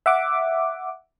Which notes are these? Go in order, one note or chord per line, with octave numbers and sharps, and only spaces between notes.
E5 F#5 D6